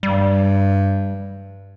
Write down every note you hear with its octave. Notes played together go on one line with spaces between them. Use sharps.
G2 G3